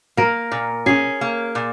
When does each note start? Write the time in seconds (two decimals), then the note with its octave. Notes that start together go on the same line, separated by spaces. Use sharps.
0.17 A#3 A#4
0.52 A#2
0.86 C#4 G#4
1.21 A#3
1.55 A#2